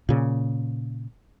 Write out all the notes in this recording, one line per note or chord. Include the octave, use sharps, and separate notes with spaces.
A#2 C#3